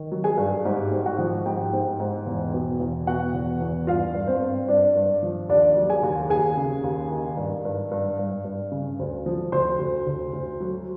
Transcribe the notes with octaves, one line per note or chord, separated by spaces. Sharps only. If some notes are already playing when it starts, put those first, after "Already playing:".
Already playing: D#3
F#3
G#4 G#5
G2
G#2 G4 G5
G#2
F#4 F#5
F3
G#2 G4 G5
G#2
G#2
E2
B2
E2
B2 F#4 F#5
E2
E2
G2 F4 F5
G2
C4 C5
G2
G2 D4 D5
G2
F3
D#2 D4 D5
F#3
G#4 G#5
D#2
D#2 G#4 G#5
C#3
D#2
D#3
G2
G2
G2
G2
G2
C#3
D2
F3
D2 C5 C6
D2
D2
D2
F#3